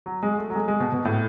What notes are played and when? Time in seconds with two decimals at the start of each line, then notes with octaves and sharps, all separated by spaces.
0.06 F#3
0.23 G#3
0.38 A3
0.50 F#3
0.55 G#3
0.68 G#3
0.80 B2
0.93 B2
1.05 A2